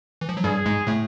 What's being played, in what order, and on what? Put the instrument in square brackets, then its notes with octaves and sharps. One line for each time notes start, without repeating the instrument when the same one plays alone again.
[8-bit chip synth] E3
F3
F#3
[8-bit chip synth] G2 G3 [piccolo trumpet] G#4
[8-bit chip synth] G#2 G#3
A2 A3